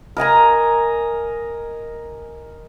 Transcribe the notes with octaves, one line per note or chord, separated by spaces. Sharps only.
A#4 D#5 G#5 A#5